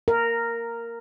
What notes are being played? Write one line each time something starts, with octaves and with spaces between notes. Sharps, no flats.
A#4